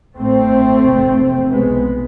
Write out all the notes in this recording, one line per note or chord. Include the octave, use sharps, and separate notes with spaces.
A1 A2 A3 C4
F1 E2 C3
B1 B2 G#3 B3